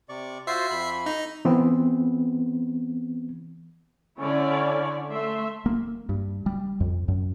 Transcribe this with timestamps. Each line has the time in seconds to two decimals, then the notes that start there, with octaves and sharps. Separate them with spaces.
0.09 C3 D5 C#6
0.47 F4 F#4 C5 E5 C7
0.70 F2 B5
1.06 D#4
1.45 E3 B3 C4
4.19 D3 C#4 E4 C#5 D5
5.10 A3 E5 C6
5.66 A#3
6.09 G2
6.46 G3
6.80 F2
7.08 F#2